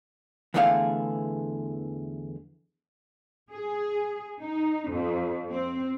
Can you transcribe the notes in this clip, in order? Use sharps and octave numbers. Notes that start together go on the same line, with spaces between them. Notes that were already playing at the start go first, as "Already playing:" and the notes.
E2 D3 E3 A3 G#4 F5
G#4
D#4
F2
C4